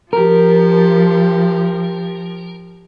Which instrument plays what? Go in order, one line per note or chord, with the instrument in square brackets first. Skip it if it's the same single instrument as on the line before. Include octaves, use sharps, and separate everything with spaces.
[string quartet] F3 [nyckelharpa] G4 [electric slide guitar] A#4